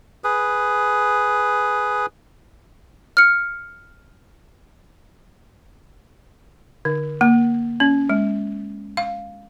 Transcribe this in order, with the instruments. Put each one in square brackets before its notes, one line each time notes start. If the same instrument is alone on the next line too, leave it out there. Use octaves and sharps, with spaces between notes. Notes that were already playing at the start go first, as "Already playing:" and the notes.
[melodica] G#4 B4
[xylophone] F6 C#7
[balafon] D3
A#3
C#4
G#3
F5